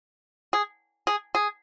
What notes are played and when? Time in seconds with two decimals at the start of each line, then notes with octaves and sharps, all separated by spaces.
0.53 G#4
1.07 G#4
1.35 G#4